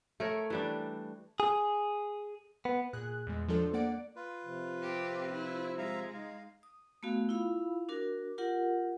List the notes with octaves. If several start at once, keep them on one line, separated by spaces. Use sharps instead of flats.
A3 A#4 C#5
E3 G3 D4
G#4
B3
A#2 G#4 F#6
E2 G#3
F3 F#3 D4 F4 A4 C5
A#3 D5 F#5 D7
F4 B4
C3 F3
C4 G4
E4
G#3 E5 F5 A#5
D#4 F5
D#6
A3 B3 F#4 F5
E4 F4 F5 B5
D4 F#4 A#4
F4 G4 A#4 F#5